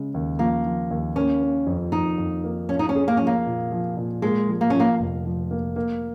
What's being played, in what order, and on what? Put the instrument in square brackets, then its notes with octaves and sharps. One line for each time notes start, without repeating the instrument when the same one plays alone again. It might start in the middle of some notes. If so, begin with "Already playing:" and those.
Already playing: [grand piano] C#3 G#3
D#2
[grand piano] F3 [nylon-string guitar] A#3
[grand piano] F3
D#2
[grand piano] A#3 [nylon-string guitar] C#4
[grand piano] A#3
F2
[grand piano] F2 [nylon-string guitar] D#4
[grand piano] F2
A#3
[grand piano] F3 [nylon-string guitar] C#4
[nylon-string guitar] D#4
C#4
[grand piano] G#4
[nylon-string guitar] A#3
[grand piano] F3 [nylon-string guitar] C#4
[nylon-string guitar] A#3
[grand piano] A#2
F3
A#2
[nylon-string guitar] G#3 [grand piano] A#3
[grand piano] F3
[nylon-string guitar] A#3
[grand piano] F3 [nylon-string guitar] C#4
[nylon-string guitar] A#3
[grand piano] F1
F3
A#3
A#3